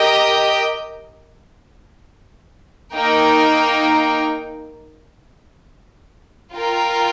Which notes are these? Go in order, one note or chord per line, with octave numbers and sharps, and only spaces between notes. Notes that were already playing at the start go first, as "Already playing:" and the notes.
Already playing: G4 A#4 D#5 G5
A#3 D#4 A#4 G5
F4 A#4 G5